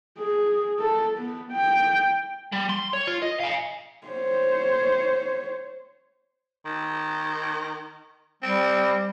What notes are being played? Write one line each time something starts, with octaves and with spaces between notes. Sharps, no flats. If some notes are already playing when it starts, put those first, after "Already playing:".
G#4
A4
B3
G5
G3
C6
C#5
F4
D#5
F5 G#5
C5 C#5
D#3
G3 C4